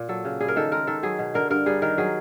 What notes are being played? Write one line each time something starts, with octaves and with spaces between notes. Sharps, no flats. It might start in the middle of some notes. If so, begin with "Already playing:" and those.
Already playing: A#2
F#3 A4
C#3
G3 G#4
A#4
D#3 A4
G#3 A#4
D#3 A4
F#3 G#4
B2
D3 A#4
G2 A#4
G3 G#4
D#3 A#4
F#3 G#4